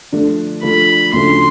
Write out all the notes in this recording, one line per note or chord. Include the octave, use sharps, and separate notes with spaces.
D3 F3 A3 D4 F4
D3 F3 A3 D4 F4 B5
D2 C#3 F3 A3 D4 C6